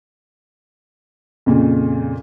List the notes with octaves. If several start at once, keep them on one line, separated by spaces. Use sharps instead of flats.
F2 A#2 C#3